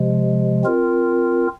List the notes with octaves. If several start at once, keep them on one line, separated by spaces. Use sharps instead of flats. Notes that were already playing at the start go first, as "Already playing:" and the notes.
Already playing: C3 F3 G#3
C4 F4 A#4